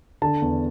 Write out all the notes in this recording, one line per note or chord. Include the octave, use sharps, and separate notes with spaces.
D3 A5
E2